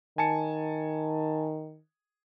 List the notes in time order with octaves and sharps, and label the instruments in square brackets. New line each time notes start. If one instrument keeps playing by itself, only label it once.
[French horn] D#3 [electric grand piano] G#5 A5 C#7